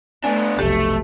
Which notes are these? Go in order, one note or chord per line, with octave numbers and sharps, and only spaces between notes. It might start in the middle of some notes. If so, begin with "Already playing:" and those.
A3 B3 D4 G#5
F1 B1 A3 G4